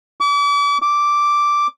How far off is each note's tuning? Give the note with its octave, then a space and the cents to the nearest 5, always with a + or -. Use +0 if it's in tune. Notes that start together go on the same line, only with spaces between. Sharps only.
D6 -40
D6 -5